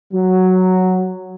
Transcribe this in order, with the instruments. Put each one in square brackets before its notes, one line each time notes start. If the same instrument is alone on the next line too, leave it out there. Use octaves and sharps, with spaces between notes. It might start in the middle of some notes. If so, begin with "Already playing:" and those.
[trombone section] F#3